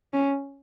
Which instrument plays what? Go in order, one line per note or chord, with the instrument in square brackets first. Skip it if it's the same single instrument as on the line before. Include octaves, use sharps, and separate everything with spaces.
[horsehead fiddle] C#4